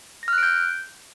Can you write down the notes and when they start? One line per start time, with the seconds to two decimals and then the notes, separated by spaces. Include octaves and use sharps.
0.23 A#6
0.28 F6
0.33 F#6
0.38 D7
0.43 G6